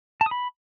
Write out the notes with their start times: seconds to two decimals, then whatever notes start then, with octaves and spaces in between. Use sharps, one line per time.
0.21 A5
0.26 D#6
0.31 B5